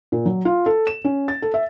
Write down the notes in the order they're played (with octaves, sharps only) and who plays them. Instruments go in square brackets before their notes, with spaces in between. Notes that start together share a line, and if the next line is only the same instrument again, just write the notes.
[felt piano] A#2
F#3
F4
A4
E7
C#4
A6
A4
E5